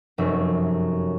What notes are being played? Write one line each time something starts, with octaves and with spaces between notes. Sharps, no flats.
F1 F#2 E5